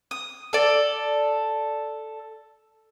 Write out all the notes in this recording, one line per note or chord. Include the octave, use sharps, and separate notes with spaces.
D#6
A4 D5